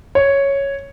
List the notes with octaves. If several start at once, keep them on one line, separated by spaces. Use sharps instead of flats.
C#5